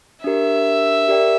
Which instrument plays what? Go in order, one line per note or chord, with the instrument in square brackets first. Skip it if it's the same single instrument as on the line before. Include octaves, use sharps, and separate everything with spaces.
[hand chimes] D4 G4 A#4 [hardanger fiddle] E5
[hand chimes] G4 A#4 D5 G5